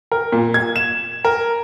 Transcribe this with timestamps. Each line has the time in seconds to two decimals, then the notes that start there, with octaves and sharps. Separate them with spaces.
0.12 A#4
0.32 A#2
0.54 G#6
0.76 E7
1.25 A#4